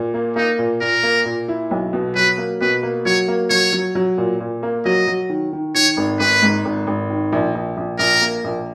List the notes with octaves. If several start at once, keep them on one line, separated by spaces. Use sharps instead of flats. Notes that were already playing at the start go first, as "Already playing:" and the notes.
Already playing: A#2
A#3
A#3 D#4
A#2
A#2 A#4
A#3
A#2
E4
B1
B2
F#3 B4
A#3
B2 B4
A#3
F#3 C#5
A#3
F#3 C#5
F#3
F#3
A#2
A#2
A#3
F#3 D#5
F#3
D#3
D#3
D#3 C#5
G#1
G#1 B4
G#2
G#1
G#1
D#3
A#1
A#1
A#1
A#1 A#4
A#3
A#1